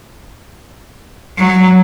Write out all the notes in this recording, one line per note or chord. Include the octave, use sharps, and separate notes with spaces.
F#3